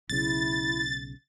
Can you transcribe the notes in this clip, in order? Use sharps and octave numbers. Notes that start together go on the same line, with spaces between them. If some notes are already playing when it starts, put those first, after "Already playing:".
B1 C#3 E4 A6